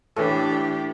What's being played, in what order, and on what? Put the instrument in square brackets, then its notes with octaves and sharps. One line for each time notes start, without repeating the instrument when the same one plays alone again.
[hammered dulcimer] A2 [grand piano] E3 A4 [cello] D4 G4